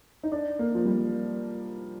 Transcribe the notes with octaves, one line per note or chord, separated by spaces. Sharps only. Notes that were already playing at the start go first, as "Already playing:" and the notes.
D#4
D4
A#3
F3
G3